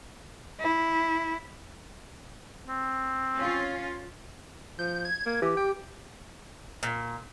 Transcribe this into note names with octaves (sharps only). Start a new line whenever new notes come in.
E4
C4
C#4 F4
F3 G6
G#6
A#3
E3 G4
G5
A#2